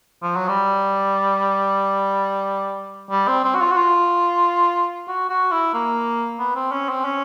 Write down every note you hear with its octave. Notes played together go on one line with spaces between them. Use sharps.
F3
F#3
G3
G3
C4
C4
F#4
F4
F#4
F4
F#4
F#4
E4
A#3
B3
C4
C#4
C4
C#4